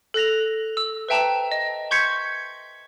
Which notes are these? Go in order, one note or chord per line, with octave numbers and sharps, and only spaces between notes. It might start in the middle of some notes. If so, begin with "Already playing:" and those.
A4 F#6 A#6 F7
E6
B4 C5 E5 G5 A5 A#5
D#5
C6 C#6 G6 G#6 B6 C#7